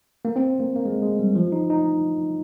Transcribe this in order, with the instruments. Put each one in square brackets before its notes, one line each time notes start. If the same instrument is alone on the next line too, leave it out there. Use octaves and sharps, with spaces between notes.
[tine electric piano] A#3
C4
A#3
A#3
G#3
G#3
G3
F3
D#4
D#4